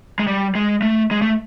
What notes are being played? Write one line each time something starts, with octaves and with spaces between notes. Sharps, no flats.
G#3
G3
G#3
A3
G#3
A3